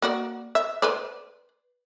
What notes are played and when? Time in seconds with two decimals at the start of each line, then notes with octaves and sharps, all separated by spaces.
0.02 A#3 F#4 D5
0.55 E5
0.82 B4 C5 D5